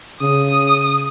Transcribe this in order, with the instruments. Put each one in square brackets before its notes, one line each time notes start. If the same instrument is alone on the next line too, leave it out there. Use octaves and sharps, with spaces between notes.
[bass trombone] C#3 [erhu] D#6